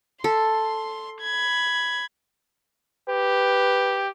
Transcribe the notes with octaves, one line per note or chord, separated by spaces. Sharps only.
A4 C6
B5 G#6
G4 B4